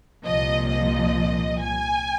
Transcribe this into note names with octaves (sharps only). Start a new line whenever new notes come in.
C2 A#2 F3 D#5
D#5
G#5